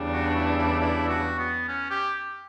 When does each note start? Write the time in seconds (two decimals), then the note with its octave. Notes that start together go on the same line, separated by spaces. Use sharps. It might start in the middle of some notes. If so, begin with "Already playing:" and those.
Already playing: E2 C#3 G3 D4
0.13 F#4
0.35 E4
0.57 E4
0.80 E4
1.09 F#4
1.39 B3
1.68 C#4
1.90 G4